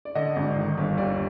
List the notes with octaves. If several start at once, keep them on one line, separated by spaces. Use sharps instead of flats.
D5
D3 D#5
G#1
D#3
G1
D#2 D5